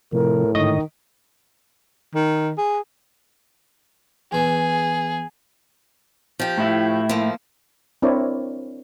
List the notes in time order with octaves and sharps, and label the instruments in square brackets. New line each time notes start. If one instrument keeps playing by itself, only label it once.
[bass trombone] A2 [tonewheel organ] C3 F3 [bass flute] A#4
[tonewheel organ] G#2 D3 [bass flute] D#3 [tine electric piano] D#5 C#6 D#6
[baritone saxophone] D#3
G#4
[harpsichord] E2 E3 [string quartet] G#4
[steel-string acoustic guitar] F3 G4
[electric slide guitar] A2 E4
[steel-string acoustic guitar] F3 A#3
[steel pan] C4 D4 E4 A#4 C#5 D5